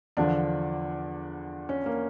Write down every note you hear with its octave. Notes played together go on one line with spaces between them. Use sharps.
E2 D3 F3 D4
C#4
A#3